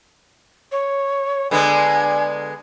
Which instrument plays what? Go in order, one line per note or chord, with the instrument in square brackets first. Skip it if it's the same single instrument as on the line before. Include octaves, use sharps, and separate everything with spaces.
[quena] C#5
[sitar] D3 G#3 B3 [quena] G#5